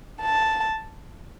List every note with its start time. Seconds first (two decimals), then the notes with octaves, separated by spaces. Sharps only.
0.22 A5